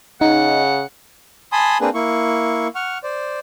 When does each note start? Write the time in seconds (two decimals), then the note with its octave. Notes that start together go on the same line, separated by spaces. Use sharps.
0.21 C#3 D#4 F#5
1.52 G#5 A5 B5 C6 D#6
1.81 A#3 C4 D4 G#4 B4
1.94 A#3 E4 C#6
2.75 F#5 C#6 F6
3.03 C5 D5